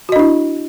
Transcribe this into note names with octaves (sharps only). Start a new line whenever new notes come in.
D4 E4 F#4 D#5